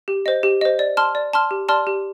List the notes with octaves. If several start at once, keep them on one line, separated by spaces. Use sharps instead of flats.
G4
C5 D#5
G4
C5 D#5
D5
A5 C6 F6
D5
A5 C6 F6
G4
D5 A5 C6 F6
G4